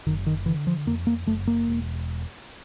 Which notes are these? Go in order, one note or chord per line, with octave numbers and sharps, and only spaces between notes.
F#1 D#3
D#3
D3 E3
F3
F2 A#3
A#3
F#1 A3
A#3
E1